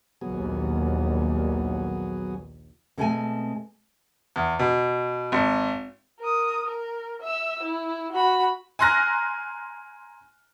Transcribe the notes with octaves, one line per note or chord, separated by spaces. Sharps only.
A#1 D#2 F#3 B3 G#4
B2 G#3 A3 C4 G5 G#5
E2
B2
G#1
A#4 D#6
A#4
E5 E6
E4
F#4 B5
G#5 A#5 C6 F6 F#6 A#6